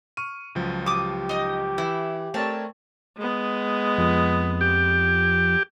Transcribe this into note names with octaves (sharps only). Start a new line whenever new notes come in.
C#6 F6 D#7
C#2 F3 F#3
G4 D6 D#6
D#4 D#5
E3 E4
A3 C4 A#4 C#5 D5 A5
G#3 B3
F2
G4